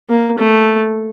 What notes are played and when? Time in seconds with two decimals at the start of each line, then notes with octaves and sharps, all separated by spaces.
0.10 A#3
0.38 A3